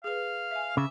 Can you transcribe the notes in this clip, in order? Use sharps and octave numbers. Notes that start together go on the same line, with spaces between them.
G#4 B4 F5
E5 G#5
C#3 E5 D6